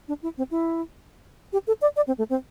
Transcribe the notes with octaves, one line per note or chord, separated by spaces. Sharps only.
D4
E4
C4
E4
G4
A4
D5
D5
C4
A3
C4